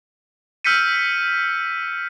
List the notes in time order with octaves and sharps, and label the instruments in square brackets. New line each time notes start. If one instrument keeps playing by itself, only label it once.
[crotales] E6 F6 G6 B6 C#7 D#7